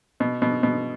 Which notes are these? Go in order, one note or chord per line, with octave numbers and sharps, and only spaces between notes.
B2
B2
B2